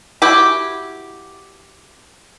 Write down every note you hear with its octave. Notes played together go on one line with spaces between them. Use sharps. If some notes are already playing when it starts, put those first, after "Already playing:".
E4 F#4 G4